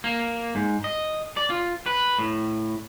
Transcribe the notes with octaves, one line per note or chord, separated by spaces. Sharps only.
A#3
G#2
D#5
D5
F4
B4
A2